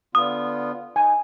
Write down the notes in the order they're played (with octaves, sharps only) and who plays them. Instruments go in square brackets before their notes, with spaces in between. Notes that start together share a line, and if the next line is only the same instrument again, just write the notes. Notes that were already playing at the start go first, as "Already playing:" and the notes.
[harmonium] D3 B3 F4 [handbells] D#6
[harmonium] D#4 [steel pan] G#5